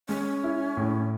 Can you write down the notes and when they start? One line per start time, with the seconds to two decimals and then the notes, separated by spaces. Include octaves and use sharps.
0.09 G#3 C#4
0.44 E4
0.77 A2